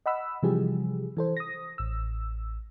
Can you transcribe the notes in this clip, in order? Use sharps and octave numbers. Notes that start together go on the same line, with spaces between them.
D#5 F#5 B5 E6
C3 E3 F3 G3 G4 G#4
E3 A4 C5
D#6 A#6
A1 E6